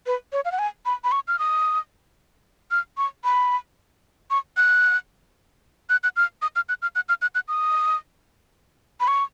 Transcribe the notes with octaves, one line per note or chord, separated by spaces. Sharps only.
B4
C#5
F5
F#5
G#5
B5
B5
C#6
F6
D#6
F6
C#6
B5
C#6
F#6
F#6
F#6
F6
D#6
F6
F#6
F6
F#6
F6
F#6
F#6
D#6
B5
C#6